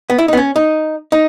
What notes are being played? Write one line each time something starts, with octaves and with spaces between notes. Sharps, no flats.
B3
E4
D#4
B3
C#4
D#4
D#4